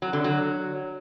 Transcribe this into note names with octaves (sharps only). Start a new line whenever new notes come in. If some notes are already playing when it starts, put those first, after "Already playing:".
F#3
D3
F#3